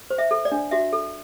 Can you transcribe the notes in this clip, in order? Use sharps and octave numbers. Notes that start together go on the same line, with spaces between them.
C5
E5
A4
D5
D4
F#4 E5
A4